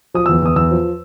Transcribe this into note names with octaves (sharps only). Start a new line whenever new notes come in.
F3 D#6
E6
E2
E2 D#6
E2 E6
F3